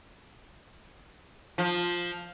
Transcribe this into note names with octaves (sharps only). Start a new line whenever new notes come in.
F3